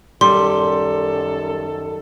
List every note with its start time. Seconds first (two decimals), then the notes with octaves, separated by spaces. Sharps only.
0.21 F#2 D#3 G3 A4 C6